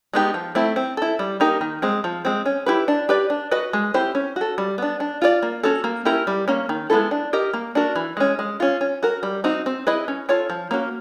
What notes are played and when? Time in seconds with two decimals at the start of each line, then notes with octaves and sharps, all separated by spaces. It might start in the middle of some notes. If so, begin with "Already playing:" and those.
0.13 G#3 B3 D#4 G4
0.34 F3
0.55 A3 C4 E4
0.76 C4
0.97 E4 A4
1.19 G3
1.40 A#3 D#4 G4 A#4
1.61 D#3
1.82 G#3 C4
2.04 F3
2.25 G#3 C4
2.46 C#4
2.66 E4 G4 B4
2.88 D4
3.09 G4 B4 D5
3.30 D4
3.51 F#4 B4 D#5
3.73 G#3
3.94 C4 E4 G4 C5
4.15 C#4
4.36 F#4 A4
4.58 G3
4.78 B3 D4
5.00 D4
5.22 F4 A4 D5
5.43 A#3
5.63 C#4 F#4 A4
5.84 A#3
6.05 C#4 E4 G4 A#4
6.27 G3
6.48 A#3 C#4
6.69 D#3
6.90 G#3 B3 E4 A4
7.11 D4
7.33 G4 A#4 D#5
7.54 A#3
7.75 D4 F#4 A#4
7.96 E3
8.17 G#3 C#4
8.39 G#3
8.60 C#4 F4
8.81 C#4
9.03 F#4 A#4
9.23 G3
9.44 C4 D#4 F#4
9.66 C4
9.87 E4 G#4 B4 D#5
10.08 C#4
10.29 F4 A4 C#5
10.50 F3
10.71 A#3 C#4 F#4